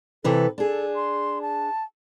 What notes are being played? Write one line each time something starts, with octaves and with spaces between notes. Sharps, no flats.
C3 E3 A4 B4
D4 G#4 A4
C6
A5